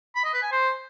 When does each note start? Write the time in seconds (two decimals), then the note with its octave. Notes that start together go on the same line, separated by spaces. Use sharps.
0.15 B5
0.25 D#5
0.34 B4
0.43 G#5
0.52 C5